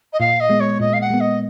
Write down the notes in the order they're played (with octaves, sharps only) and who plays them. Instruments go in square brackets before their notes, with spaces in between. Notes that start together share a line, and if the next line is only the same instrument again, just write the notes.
[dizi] D#5
[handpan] A#2 [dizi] F5
[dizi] D#5
[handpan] G#3 B3
[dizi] C#5
[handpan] A#2 [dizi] D#5
[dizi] F5
F#5
[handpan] G#3 B3
[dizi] D#5